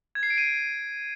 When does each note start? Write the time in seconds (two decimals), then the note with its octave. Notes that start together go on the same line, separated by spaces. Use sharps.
0.15 G#6
0.23 C7
0.30 D7
0.38 D#7